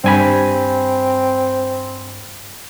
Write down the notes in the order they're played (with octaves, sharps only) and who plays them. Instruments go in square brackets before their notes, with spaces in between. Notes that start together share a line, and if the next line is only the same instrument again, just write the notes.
[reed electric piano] G2 G#5 B5 [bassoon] C4